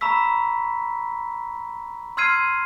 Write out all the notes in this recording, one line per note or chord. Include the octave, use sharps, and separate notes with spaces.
A#5 B5 C#6 E6 B6
C6 E6 F6 G#6 C7 D#7